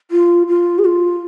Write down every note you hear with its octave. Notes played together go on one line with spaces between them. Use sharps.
F4
F4
G#4
F4